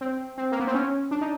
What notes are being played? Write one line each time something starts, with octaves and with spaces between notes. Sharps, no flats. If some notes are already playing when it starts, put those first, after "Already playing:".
C4
C4
A#3
B3
C4
C#4
D4
D#4